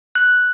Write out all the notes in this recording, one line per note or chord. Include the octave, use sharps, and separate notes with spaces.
F#6